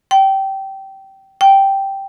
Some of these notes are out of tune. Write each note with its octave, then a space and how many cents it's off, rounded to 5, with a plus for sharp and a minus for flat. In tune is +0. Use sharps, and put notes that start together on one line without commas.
G5 -20
G5 -5